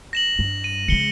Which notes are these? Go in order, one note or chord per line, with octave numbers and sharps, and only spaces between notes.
A#6 E7 F#7
G2
D#7
C#3 G#3 C#7 G7